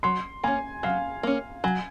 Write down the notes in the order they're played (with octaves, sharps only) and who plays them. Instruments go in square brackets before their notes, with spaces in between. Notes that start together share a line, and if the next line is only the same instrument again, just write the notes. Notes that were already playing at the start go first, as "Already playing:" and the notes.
[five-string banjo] F#3 [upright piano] C6
[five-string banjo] A#3 C#4 [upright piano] G#5
[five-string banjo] F#3 [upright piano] F5
[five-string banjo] A#3 C#4
[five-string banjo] F#3 [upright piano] G#5